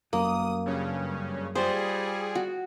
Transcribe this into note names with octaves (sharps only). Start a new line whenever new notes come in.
G1 F#2 A#3 D#6
G2 C#3 C#4
G3 F4 G#4 C5
F#4